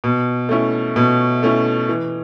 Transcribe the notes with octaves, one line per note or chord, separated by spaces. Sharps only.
B2
A3 C#4 E4
B2
A3 C#4 E4
E3